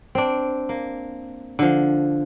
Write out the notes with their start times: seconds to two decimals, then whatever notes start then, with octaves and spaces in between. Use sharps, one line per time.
0.15 C4 D4
0.69 A#3
1.59 D3 F3